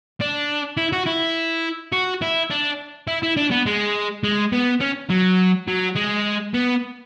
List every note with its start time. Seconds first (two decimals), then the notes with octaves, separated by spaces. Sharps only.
0.21 D4
0.77 E4
0.93 F#4
1.07 E4
1.93 F#4
2.22 E4
2.50 D4
3.08 E4
3.23 E4
3.37 D4
3.51 B3
3.66 G#3
4.24 G#3
4.53 B3
4.81 C#4
5.10 F#3
5.68 F#3
5.96 G#3
6.54 B3